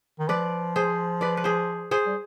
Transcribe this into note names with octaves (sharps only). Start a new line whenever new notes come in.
D#3
F3 B4 D5
G#4 C5
B4 D5
B4
G#4 C5
G#4 C5
G3